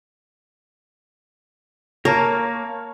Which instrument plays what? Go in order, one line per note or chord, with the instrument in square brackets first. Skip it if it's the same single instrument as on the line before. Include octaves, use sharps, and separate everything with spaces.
[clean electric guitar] A#3 [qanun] A#4 [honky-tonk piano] C#5 A5